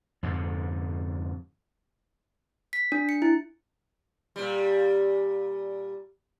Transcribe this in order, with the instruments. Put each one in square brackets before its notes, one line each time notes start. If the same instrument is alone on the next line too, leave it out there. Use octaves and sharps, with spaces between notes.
[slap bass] F2 G#2 D3
[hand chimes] B6
D4
C#7
E4
[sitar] A#2 G3